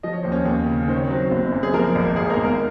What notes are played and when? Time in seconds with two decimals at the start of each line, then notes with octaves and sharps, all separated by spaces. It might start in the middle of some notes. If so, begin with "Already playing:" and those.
0.03 F3 D#5
0.13 C#5
0.23 D#2 C5
0.32 C#4 C#5
0.46 D#2
0.67 C#3
0.88 D#3 C5
0.97 C#5
1.04 C4 C5
1.10 F#3
1.31 F#1
1.52 F#2
1.63 G#4
1.73 F3 A#3 A#4
1.95 G#1
2.16 G#1 G#4
2.30 A#3 A#4
2.37 G#2
2.45 A#3 A#4